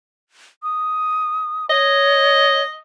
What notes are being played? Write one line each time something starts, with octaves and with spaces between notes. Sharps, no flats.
D#6
C#5 D#5